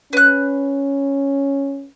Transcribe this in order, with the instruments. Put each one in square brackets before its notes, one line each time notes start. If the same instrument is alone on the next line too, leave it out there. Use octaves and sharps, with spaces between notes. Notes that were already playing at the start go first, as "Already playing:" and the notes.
[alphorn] C#4 [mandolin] B4 F#6